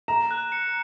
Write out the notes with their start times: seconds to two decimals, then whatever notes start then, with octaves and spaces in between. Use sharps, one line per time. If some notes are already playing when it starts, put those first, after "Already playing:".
0.08 A#5 E7
0.31 F#6
0.52 C#7